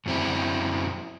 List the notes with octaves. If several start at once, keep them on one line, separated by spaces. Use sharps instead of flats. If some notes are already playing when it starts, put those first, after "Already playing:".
F#2 F#3 C4 E4